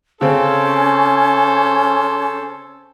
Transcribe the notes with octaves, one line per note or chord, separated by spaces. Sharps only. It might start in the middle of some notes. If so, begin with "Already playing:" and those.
C#3 C4 C#4 A4 C5